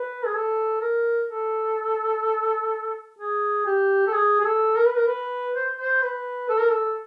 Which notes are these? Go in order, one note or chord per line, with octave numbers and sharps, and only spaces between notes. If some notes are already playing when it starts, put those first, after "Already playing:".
Already playing: B4
G#4
A4
A#4
A4
G#4
G4
A4
G#4
G#4
A4
A#4
B4
A#4
B4
C5
C5
B4
A4
A#4
A4